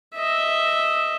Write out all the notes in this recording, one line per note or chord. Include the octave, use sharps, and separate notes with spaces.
D#5 E5